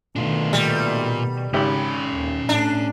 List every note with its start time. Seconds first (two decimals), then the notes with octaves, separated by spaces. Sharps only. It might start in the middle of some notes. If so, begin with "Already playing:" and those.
0.16 B2 D#3 A3 D4 F4
0.53 A#2 G3
1.54 G#1 C#3 C#4 G4 B5
2.14 D#2
2.49 A2 D4